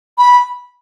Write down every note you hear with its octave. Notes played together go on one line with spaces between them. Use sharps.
B5